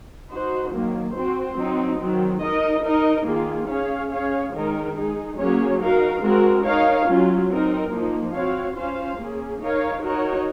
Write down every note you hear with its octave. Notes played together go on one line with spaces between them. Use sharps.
D#4 F#4 C5
D#3 F#3 A#3
C4 F#4 C5
F#3 C4 D#4
D#3 F#3 C4
D#4 A#4 D#5
D#4 A#4 D#5
D#3 A#3 F4 G#4
C#4 G#4 C#5 F5
C#4 G#4 C#5 F5
D#3 G#3 D#4 A#4
G#3 D#4 G#4
F#3 A#3 C#4 G#4 C#5
D#4 F#4 A#4 F5
G#3 C4 F#4 A#4
D#4 A#4 C#5 F5
F#3 C#4 F4
C4 D#4 A#4
F3 A#3 D#4
C4 F#4 C#5 F5
C#4 F4 C5 F5
A#3 C#4 G#4
D#4 A#4 C#5 F5
D#4 F#4 A#4 C#5